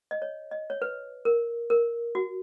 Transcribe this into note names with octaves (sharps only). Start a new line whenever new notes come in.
D#5
C#5
D#5
C#5
B4
A#4
A#4
F#4